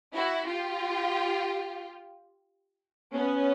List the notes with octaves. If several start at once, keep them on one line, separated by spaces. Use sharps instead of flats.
E4 F#4
F4 G4
B3 C#4